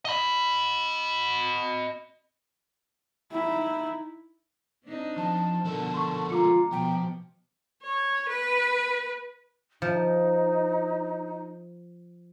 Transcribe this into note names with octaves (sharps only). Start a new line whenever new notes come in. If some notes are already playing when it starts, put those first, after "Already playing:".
D#5 B5
D#4 E4
C4 D4 D#4
F3 A5
B2 D3 F3 A4 A#4
C6 C#6
G#3 F4 A#5 D6 C#7
B2 F3 G5
C#5
B4
F3 D#4